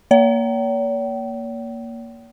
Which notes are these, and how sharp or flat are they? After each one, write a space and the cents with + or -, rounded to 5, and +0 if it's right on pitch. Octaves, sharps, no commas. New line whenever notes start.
A#3 +0 C#5 +45 G5 -40